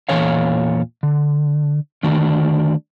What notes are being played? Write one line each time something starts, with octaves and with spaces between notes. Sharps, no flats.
E2 A#2 E3 A4 C#5 F5
D3
D3 D#3 A3 D4 F#4